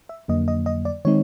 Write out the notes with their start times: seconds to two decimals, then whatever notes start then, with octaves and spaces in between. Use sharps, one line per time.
0.09 E5
0.28 F2 D3 F#3 A#3 D#5
0.48 D#5
0.66 D#5
0.85 D5
1.05 D#3 G#3 C4 D#4 C#5